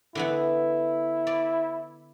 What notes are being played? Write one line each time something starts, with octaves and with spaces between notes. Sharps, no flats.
D3 E3 B3 E4
D5